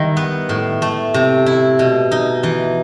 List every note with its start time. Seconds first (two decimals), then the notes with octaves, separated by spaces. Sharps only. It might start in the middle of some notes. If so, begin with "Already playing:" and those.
Already playing: D#3 G3 E4
0.17 B3
0.49 A2
0.82 A3
1.14 C3
1.46 E4
1.79 B2
2.11 D#4
2.43 E3